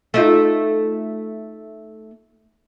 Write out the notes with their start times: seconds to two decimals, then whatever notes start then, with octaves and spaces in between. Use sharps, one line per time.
0.14 A3 D#4 F4